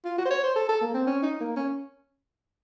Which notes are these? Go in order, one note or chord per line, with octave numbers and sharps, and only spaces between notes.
F4
F#4
C5
C#5
C5
A4
A4
A#3
C4
C#4
D#4
A#3
C#4